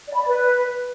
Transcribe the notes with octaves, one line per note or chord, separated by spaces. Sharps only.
D5
B5
D5
B4